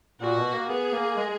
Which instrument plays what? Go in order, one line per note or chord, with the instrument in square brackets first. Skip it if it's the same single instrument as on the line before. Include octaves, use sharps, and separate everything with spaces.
[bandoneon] A#2 [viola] F#4
[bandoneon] B2
A#3
[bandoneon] B3 [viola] G#4
[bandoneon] A#3
G#3